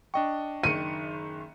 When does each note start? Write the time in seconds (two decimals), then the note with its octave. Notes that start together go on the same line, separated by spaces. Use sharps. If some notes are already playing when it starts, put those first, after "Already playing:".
0.14 D4 D#5 G5 C#6
0.63 F#1 D#3 C#7 D#7